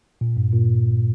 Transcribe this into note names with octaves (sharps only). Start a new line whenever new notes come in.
A#2
G2
A#2